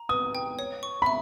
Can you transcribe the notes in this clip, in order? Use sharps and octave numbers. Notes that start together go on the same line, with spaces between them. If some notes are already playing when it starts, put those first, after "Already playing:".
Already playing: A#5
B4 D#6
G5
C#5
C#6
B5
E5